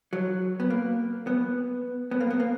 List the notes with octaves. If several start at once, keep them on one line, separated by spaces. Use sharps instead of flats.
F#3
B3
A#3
B3
B3
A#3
B3
A#3